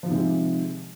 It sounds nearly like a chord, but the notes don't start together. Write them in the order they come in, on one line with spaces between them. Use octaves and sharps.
F3 D#3 C3 G#3